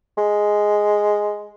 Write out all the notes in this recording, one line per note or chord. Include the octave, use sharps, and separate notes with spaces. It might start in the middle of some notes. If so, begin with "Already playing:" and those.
G#3